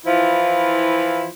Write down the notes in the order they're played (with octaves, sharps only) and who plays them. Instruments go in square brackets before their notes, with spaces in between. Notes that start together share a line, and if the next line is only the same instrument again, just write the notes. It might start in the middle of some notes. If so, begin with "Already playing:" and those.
[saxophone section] E3 F3 E4 F4